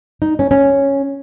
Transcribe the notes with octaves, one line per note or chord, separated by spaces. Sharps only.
D#4
C#4
C#4